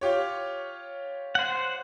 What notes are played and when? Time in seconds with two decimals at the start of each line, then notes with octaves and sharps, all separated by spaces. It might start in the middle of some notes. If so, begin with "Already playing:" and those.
0.01 F4 G4 C#5
1.35 C5 F#5